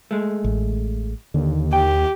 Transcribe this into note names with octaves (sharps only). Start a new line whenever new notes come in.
G#3 A3
A1
D#2 D3
G4 G5